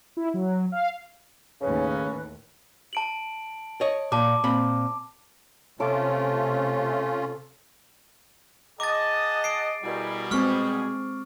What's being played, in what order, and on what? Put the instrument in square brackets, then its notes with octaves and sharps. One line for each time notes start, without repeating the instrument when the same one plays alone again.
[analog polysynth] E4
F#3
F5
[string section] D#2 A2 [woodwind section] C#3 [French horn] C#4 [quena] B4
[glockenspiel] A5 D7 F#7
[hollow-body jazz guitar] C#5 D#5
[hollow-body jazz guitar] A#2 [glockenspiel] A5 D6
[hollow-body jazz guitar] A#2 C4 B5
[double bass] C3 [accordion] A3 C#4 F4 [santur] A4 D6 [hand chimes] C#5
[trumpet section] G#4 F#5 A5 [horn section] D#5 [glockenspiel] D6 A6
[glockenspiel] C7 D7
[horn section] B2 G3 [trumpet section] E4 G#4 A#4
[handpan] G#3 C4 [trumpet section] G#4 [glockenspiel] C#6 F6